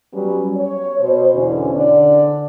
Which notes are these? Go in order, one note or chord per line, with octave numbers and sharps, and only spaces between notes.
F#3 G3 B3 C#4 G4
C#5
B2 C5
E2 B2 D3 C#4 D4 E4
D3 D4 D5